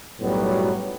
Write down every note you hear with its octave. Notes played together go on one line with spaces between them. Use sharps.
B1 F#2 A2 F#3 G3 B3